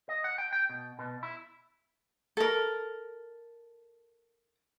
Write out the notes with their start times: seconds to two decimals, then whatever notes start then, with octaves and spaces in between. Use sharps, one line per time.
0.09 D#5
0.24 F#5
0.38 G5
0.53 G5
0.69 B2
0.99 B2
1.23 E4
2.37 A4 A#4